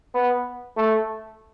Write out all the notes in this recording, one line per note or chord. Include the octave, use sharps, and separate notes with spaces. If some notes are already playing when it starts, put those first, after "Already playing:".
B3
A3